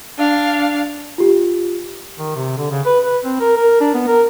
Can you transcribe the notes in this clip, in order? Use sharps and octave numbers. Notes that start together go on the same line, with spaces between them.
D4 F5
F4 G4
D#3
C3
D3
C#3
B4
B4
C4
A#4
A#4
D4
B3
A#4